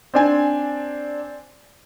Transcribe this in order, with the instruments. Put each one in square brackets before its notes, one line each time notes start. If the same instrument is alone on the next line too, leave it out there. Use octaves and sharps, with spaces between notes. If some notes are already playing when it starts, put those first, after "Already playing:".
[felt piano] C4 D4 G#5